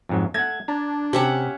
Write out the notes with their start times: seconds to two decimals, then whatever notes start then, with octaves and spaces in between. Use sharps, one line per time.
0.09 F2 G#2 F#3
0.34 A3 F#5 G#6
0.68 D4 A#5
1.13 C3 C#4 G4 E5 F#5